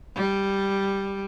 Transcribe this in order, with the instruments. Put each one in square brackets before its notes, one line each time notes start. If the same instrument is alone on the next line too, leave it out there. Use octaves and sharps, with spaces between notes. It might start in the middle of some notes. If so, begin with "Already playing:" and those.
[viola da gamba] G3